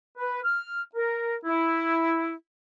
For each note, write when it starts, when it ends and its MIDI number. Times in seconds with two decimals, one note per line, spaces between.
0.17 0.39 71
0.43 0.80 89
0.94 1.35 70
1.45 2.32 64